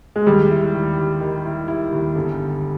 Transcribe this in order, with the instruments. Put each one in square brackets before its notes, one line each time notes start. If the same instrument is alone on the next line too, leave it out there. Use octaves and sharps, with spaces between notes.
[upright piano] G#3
[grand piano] D#2 [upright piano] G3
[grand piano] E4
D#2
D#2
D#3
E4
E4
D#2
G1